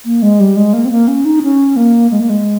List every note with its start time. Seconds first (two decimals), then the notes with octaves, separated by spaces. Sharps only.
0.05 A#3
0.22 G#3
0.40 G3
0.56 G#3
0.74 A#3
0.85 C4
0.91 A#3
1.08 C#4
1.25 D#4
1.43 C#4
1.76 A#3
2.11 G#3
2.20 A#3
2.30 G#3